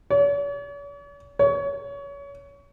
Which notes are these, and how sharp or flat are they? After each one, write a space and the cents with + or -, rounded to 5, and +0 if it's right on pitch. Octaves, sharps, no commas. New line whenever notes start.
C#5 +45
C#5 +25